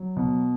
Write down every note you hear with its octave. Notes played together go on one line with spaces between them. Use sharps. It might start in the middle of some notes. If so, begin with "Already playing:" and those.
Already playing: F#3
B2